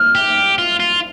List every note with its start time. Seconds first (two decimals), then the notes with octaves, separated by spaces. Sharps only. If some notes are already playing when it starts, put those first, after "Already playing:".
Already playing: F6
0.15 G4
0.58 F4
0.80 F4